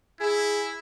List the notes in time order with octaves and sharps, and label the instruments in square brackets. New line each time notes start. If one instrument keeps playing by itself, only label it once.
[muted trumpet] E4 [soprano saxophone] G#4